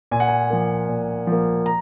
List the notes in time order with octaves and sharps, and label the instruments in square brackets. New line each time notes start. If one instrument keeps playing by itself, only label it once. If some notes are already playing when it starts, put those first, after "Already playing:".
[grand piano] A#2 G#5
F#5
G#5
F3 A#3
A#2
F3 A#3
A#5